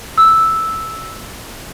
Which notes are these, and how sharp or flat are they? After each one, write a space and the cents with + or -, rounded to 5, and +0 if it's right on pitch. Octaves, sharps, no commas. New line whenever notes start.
E6 -5